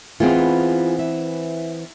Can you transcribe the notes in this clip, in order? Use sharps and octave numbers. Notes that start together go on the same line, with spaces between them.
E3 B3 C4 F4 G#4
E5